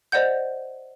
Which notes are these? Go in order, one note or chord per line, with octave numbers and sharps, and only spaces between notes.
C5 D5 D#5 F#5 G6